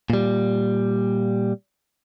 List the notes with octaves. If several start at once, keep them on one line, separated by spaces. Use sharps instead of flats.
A#2 G3